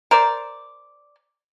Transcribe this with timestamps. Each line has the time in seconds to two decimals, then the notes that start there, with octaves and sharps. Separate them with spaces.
0.11 A#4 C5 D5